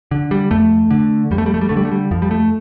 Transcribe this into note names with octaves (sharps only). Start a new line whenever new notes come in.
D3
G3
F2 A3
D3
F2 G3
A3
G3
A3
G3
D3 A3
G3
A3
G3
F2 F3
G3
A3